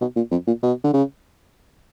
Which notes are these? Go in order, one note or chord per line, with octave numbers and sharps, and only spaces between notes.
B2
A#2
F2
A#2
B2
D3
C#3